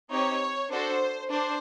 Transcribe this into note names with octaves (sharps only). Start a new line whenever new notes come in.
C4 D#4 G4 C#5
D4 F#4 A4 C5
D4 C5